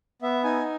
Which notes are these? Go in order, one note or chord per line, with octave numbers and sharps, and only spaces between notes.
B3 E5
D#4 G#5